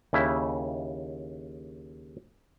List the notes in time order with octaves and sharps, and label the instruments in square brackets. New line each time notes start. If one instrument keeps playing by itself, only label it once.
[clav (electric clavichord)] D#2 C#3 E4 E5